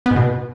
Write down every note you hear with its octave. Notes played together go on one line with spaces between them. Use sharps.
B3
G#2
B2